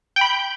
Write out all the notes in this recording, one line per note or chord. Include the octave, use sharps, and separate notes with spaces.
G5
B5
G6